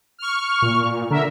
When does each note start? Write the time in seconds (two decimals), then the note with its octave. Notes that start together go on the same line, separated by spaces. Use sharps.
0.19 C#6 F6
0.62 A#2
1.11 D3 A#4 E5